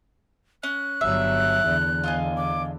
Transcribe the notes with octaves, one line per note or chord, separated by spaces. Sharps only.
C#4 F#6
G1 F#3 E5
E2 D3
F4 D#5 G#5
D6